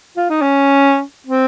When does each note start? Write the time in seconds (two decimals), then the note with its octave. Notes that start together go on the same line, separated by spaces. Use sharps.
0.17 F4
0.30 D#4
0.41 C#4
1.27 C4